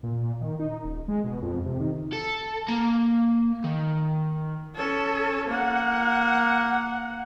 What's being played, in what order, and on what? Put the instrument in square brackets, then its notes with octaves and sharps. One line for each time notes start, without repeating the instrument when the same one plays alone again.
[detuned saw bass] A#2
D#3
D#4
D#1
G#3
B2
F2
C3
D#3
[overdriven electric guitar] A4
A#3 A#5
D#3
[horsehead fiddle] C#4 A4
A#3 F#5